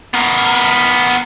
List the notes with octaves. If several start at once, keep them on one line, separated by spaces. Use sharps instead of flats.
B3 A#4